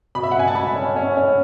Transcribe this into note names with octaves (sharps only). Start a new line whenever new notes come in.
B2 B5
E5
F#5
B2 G#5
A5
B2 B5
C#4
C#4
C#4